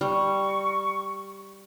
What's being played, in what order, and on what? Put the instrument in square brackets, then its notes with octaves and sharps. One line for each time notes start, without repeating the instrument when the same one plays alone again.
[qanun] G3 [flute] C#6